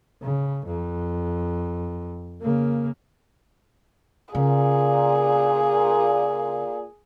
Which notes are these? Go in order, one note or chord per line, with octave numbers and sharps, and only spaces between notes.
C#3
F2
C#3 A#3
A#2 C#3 G#4